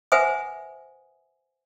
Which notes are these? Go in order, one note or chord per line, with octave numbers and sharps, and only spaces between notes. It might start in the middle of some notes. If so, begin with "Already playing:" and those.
B4 C5 E5 F#5 G#5 D#6